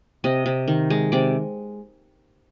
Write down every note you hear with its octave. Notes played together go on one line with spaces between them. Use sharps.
C3 D#5
C3
D#3
G#3
C3 D5